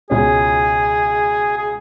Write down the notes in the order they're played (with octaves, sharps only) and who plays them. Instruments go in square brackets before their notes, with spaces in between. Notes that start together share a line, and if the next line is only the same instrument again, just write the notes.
[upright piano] C#2 B2 G#3 C#4 [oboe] G#4
[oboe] G#4